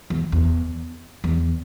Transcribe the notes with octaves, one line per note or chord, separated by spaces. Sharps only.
E2
E2
E2